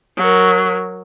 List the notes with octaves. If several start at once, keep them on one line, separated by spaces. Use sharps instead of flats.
F#3 A#4